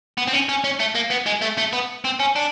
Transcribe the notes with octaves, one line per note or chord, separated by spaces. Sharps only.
B3
C4
C#4
C#4
C#4
A3
A#3
B3
G#3
A3
A3
B3
C4
C#4
D4